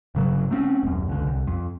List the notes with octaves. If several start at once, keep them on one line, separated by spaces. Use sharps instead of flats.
G1 C#3 F#3
A3 C4 C#4
D#1 F#2
C#2 D3
C2
F2